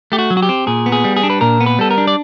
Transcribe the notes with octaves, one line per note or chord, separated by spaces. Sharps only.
A3 G4
F#4
F#3
F#4
G4
C4
A#2 G#4
B3
G#4
G3
G#4
D4
B4
A#2 A#4
B3
B4
G3 A4
A#4
D4
D5